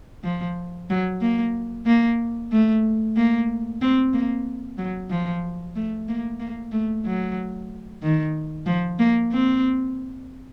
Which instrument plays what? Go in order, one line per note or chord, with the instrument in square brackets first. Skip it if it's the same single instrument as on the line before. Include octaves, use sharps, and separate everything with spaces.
[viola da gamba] F3
F#3
A#3
A#3
A3
A#3
C4
A#3
F#3
F3
A3
A#3
A#3
A3
F#3
D#3
F3
A#3
C4